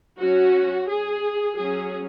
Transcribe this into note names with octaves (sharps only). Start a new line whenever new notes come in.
F#3 C#4 F#4
G#4
F#3 C#4 G#4